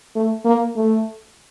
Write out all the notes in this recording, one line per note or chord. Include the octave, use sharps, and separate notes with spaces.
A3
A#3
A3